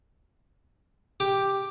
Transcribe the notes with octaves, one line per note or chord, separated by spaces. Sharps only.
G4